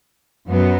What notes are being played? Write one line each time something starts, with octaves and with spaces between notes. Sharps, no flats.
F#2 F#3 B3